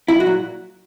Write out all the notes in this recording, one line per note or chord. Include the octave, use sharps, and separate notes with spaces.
B1 E4
F#4
A#2 F#3